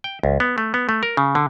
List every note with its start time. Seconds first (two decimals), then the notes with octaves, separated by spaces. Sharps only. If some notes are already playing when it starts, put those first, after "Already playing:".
0.04 G5
0.23 C#2
0.40 B3
0.58 A3
0.74 B3
0.89 A3
1.03 A#4
1.17 C#3
1.35 D3